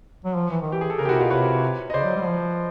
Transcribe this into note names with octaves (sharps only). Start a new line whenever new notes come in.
F#3
F3
E3
D#3
E3 G4
G#4
A4
C#3 G#4 A#4
G4
C3 E4 F#4
B2 F4 G4
C3 B4 C#5
D#5
C#3 C5 D5
F#3
G3
F#3
F3